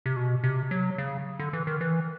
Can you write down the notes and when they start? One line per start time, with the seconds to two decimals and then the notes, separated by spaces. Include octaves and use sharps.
0.06 C3
0.16 B2
0.44 C3
0.71 F#3
0.98 C#3
1.39 D3
1.53 E3
1.67 D#3
1.81 E3